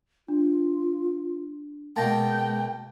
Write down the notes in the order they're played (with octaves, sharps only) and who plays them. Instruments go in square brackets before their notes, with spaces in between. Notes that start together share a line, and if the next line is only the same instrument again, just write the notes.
[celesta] D4 [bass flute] F4
[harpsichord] B2 A#3 [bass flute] G#3 [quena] G5 [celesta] A5 A6 A#6